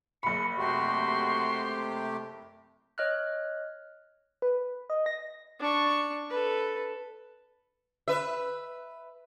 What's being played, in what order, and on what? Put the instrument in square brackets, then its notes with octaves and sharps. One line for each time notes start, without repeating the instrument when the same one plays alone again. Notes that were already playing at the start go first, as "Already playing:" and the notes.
[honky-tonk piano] F#1 B5 [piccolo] C#7
[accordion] C3 A3 G4 [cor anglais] F#4 [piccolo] C6
[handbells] C#5 D#5 F6 F#6
[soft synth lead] B4
D#5
A#6
[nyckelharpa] D4 C#6
A4 B4
[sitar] B4 E5